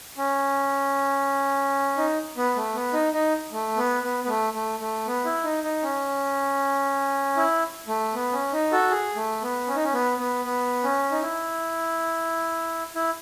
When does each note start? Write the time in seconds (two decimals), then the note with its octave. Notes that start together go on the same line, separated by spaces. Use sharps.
0.18 C#4
1.98 D#4
2.37 B3
2.56 A3
2.74 B3
2.93 D#4
3.13 D#4
3.52 A3
3.77 B3
4.03 B3
4.24 B3
4.28 A3
4.54 A3
4.80 A3
5.06 B3
5.25 E4
5.44 D#4
5.63 D#4
5.83 C#4
7.37 E4
7.88 A3
8.14 B3
8.32 C#4
8.53 D#4
8.72 F#4 A4
8.91 G#4
9.16 A3
9.42 B3
9.67 C#4
9.76 D#4
9.84 C#4
9.93 B3
10.18 B3
10.45 B3
10.83 C#4
11.11 D#4
11.22 E4
12.95 E4